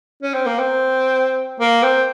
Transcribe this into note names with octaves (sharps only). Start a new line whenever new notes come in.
C#4
C4
A#3
C4
A#3
C4